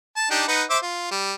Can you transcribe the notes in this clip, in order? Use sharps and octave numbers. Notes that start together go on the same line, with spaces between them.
A5
D4 D#4 G4
D#4 B4 F#5
C5 E5 D6
F4
G3